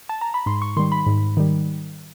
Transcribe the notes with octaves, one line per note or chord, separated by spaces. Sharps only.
A5
A#5
B5
G#2 C6
C#6
D#3 G3 C6
B5
G#2
D#3 G3